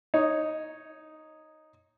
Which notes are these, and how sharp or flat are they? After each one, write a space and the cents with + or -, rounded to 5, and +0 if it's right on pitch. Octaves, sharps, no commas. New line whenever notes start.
D#4 +0 C#5 -5